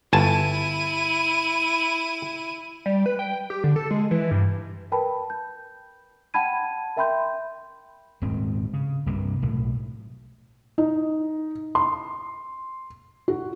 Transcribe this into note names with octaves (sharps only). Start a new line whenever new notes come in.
G1 E4 G#5 A5 D#7
G3
B4
G5
G4
D3
A4
G#3
E3
G2
A#4 B4 G5 A5 B5
G6
F#5 G5 A5 B5 G#6 D#7
A#4 E5 G5 B5 C6 G6
D#1 G#2 C4
C#3
C2 G2 C3 A#3
B1 A2
D#4
C6
F#4